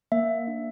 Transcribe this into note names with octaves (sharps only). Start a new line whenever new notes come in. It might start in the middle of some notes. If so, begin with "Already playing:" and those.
A#3 E5
D4